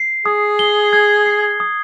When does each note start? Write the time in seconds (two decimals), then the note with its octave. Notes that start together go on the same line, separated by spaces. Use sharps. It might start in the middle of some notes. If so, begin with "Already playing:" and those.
Already playing: C7
0.26 G#4 D#6
0.59 G7
0.93 G#6
1.26 C7
1.60 D#6